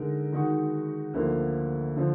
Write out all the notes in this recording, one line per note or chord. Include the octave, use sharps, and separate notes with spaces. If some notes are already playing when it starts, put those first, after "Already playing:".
Already playing: D3 G#3 D#4 A#4
D#3 G#3 D#4 F#4
D2 D3 F3 A#3
D3 F3